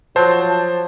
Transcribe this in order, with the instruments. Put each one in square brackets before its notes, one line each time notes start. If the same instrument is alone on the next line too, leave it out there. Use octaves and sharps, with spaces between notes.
[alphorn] F3 [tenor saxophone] F#3 [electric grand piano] C5 A5